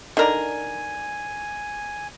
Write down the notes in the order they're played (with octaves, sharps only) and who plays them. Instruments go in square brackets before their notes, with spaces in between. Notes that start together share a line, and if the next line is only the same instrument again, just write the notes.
[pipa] D3 A#4 [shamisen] D#4 E4 D5 [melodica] G#5